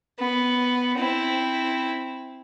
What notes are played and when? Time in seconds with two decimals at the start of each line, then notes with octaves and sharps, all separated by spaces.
0.19 B3
0.98 C4 E4